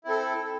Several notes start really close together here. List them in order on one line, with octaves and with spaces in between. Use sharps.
E4 C4 A4